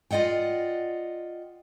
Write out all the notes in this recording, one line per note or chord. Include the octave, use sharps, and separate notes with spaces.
F4 D5 D#5 F#5 G5